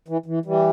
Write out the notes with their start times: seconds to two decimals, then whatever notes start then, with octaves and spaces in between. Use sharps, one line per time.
0.08 E3
0.26 E3
0.45 E3 G3